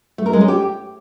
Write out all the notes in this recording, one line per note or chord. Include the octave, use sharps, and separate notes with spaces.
A3
A#4
G#3
C#4
G4